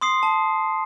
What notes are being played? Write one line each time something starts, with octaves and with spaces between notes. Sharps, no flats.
C6 D#6 C7
A5